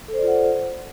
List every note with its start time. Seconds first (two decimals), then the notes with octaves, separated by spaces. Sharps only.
0.08 A4
0.13 C5
0.18 D5
0.23 F4
0.27 F#5